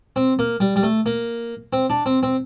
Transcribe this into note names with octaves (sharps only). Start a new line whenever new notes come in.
C4
A#3
G3
G3
A3
A#3
C4
D4
C4
C4